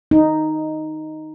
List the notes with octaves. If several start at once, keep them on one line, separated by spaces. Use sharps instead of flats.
D#4